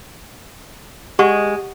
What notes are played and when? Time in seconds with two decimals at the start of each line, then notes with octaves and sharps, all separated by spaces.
1.19 G#3 G4 F#5 C#6